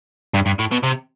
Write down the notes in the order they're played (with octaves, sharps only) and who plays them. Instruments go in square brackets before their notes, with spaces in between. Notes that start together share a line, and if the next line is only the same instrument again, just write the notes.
[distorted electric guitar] G2
G2
A2
B2
C3